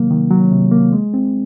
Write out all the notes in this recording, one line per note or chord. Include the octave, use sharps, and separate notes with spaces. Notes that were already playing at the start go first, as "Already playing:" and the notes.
Already playing: C3 D#3 F#3 A#3
D#3
F#3
C3
A#3
G#3
C4